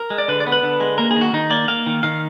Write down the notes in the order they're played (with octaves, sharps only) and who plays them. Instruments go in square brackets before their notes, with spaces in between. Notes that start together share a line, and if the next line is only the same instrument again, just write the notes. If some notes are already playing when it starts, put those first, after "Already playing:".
Already playing: [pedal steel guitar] A#4
G#3
D5
D3 B4
D5
B3
B4
D3
G#3
A#3 A#4
G#4
D#3 F#4
D#3 D#4
A#3 D5
A#3 F5
D#3
D#3 F5